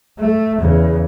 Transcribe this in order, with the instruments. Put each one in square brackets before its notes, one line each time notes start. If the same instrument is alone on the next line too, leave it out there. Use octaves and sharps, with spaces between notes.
[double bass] A3
E2 C#3